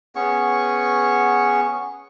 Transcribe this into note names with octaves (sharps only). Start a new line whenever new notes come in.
B3 C#4 G#4 C#6